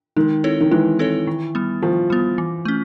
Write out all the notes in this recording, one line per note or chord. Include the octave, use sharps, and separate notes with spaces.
D#3 G#3
C4 E4 A4 C#5
D#3
E3 G#3
C4 E4 A4 C#5
D#3
G3 B3
D#3 F3
G3 B3
E3
A3 C#4